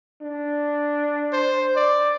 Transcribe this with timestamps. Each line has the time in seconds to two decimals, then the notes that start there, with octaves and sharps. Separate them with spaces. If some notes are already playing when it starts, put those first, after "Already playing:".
0.21 D4
1.33 C5
1.76 D5